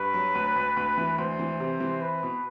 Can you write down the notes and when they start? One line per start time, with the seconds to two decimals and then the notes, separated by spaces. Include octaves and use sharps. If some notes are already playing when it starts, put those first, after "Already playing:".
Already playing: G2 B4
0.14 F#3
0.35 D2
0.56 D2
0.77 D2
0.97 E3
1.18 D2 C5
1.39 E3
1.60 C3
1.80 E3
2.02 C4 B4
2.23 B2